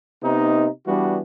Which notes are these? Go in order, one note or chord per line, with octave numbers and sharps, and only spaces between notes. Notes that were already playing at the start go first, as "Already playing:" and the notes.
C3 B3 D#4
E3 G3 B3 D4 F#4